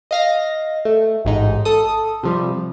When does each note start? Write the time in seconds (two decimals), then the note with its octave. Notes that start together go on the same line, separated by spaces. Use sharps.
0.11 D#5 F5 A#6
0.85 A3
1.25 A1 G#2 D#4
1.65 A4 D#6
2.23 C3 F3 G3